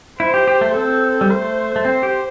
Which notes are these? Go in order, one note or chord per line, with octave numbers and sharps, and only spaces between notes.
E4 C5
G4
G4
A3
C4 A4
G3
A3 C5
A3
C4 C5
G4